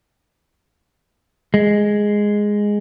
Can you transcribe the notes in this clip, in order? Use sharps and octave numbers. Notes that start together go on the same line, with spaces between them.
G#3